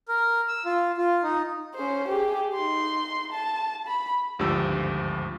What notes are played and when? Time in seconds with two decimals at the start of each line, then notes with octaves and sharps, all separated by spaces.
0.08 A#4
0.48 E6
0.65 F4
0.97 F4
1.23 D#4
1.75 C#4 C5
2.08 G4 G#4
2.54 D#4 C6
3.32 A5
3.87 B5
4.39 G#1 D2 G2 F3 G4 E6